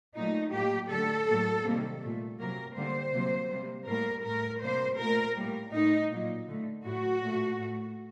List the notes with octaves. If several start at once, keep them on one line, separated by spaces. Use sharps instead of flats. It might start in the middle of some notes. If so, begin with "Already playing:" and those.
A#2 F#3 A3 D#4
A2 F#3 A#3 G4
D3 F#3 A3 A4
A2 F#3 A#3
C3 D#3 G3 A#3
A#2 A3
C3 F#3 A#3 A#4
D3 G3 A#3 C5
C3 F#3 A#3
C3 G3 A#3
A2 G3 A#3 A#4
A2 A3 A#4
C3 G3 A#3 C5
A#2 A3 A#4
A2 G3 A#3
A2 A3 D#4
A#2 F#3 A#3
D3 A3
A2 F#3 A3 F#4
A#2 A3
A2 A3